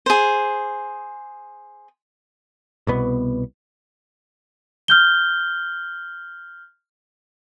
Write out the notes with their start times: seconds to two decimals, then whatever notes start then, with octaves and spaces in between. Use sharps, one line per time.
0.06 G#4 C5
2.87 C2 B2 B3
4.88 F6 G6 G7